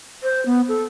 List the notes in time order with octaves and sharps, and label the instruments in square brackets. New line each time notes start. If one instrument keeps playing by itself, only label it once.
[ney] C5
B3
A4